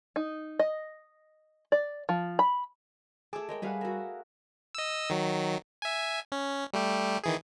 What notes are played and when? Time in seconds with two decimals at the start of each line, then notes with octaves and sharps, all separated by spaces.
0.16 D#4
0.59 D#5
1.72 D5
2.09 F3
2.39 B5
3.33 A3 G#4 G#5 A5 D6 E6
3.49 G#3 A#4 C#5 G5
3.62 G3 A3 G#4 B4 C#5 F5 F#5
3.81 F#4 A#4 E5
4.75 D#5 E6
5.10 D#3 F#3
5.82 E5 G#5
6.32 C#4
6.73 G3 A3 G4
7.24 D#3 E3 G#4